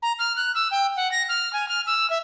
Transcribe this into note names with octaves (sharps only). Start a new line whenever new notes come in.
A#5
F6
F#6
E6
G5
F#5
A#6
F6
G#5
F6
E6
E5